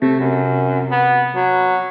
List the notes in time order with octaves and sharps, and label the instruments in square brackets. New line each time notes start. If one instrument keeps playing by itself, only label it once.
[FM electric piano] C3 [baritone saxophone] A3
[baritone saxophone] F#2
B3
F#3